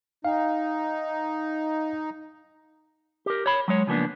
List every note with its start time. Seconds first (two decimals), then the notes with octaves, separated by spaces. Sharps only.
0.25 D#4 F5 G5
3.26 G4 A#4
3.46 C#5 B5
3.68 F#3 G#3 C#5
3.87 C#3 F3 A#3 B3 D4